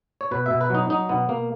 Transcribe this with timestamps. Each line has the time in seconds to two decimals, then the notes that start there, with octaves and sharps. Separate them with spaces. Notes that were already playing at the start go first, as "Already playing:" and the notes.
0.21 C#5
0.31 B2 B4
0.46 B2 E5
0.61 B4
0.70 F#3 D#4
0.90 F#3 D#4
1.09 B2 B3
1.29 B2 A#3